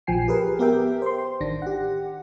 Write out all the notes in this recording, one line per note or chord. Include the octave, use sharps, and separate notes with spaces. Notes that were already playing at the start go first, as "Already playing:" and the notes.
A#1 F3 G5 G#5 C7
G4 G#4 A#4 B4
B3 G4 A#4 E5 G5
C5 C6
A1 D#3 D4 A#6
G4 F#5